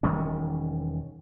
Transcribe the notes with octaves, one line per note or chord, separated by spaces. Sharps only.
E1 D#3 G3 C#4